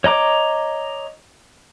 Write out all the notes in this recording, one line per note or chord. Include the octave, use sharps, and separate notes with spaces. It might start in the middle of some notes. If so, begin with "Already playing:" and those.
C#5 D#5 A#5 D6